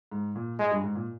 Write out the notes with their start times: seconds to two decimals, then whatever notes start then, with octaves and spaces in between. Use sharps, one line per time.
0.12 G#2
0.35 A#2
0.59 G#2 G#3
0.71 G2
0.83 G#2
0.95 A#2